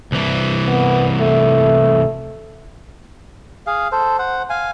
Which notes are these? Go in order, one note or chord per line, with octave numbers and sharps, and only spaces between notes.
C2 E3
B3
A3
G#4 F5
A4 C5
C5 F#5
F5 G#5